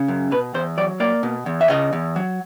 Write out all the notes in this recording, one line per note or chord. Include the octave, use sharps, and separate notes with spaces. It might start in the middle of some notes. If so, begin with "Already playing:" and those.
Already playing: C#3
F#2
B2 B4
E2 C5
F#3 D5
A#3 D5
B2
E2
E5
C#3 D#5
E2
F#3